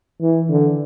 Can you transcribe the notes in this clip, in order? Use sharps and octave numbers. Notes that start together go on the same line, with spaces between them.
E3
D3